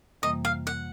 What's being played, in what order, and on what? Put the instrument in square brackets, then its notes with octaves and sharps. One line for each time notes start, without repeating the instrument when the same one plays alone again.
[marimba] F2 C3 E3 G3 A#3 [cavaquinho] D#5
[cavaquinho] F5
F#5